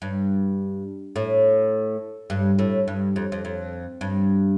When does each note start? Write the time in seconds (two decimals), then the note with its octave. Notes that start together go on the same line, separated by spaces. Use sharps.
0.02 G2
1.16 A2
2.30 G2
2.59 A2
2.88 G2
3.16 F2
3.32 F2
3.45 F2
4.01 G2